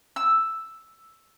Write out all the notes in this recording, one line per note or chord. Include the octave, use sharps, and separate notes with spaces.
E6